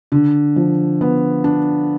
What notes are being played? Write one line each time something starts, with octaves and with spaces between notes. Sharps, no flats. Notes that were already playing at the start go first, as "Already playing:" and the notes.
D3
F3
B3
D4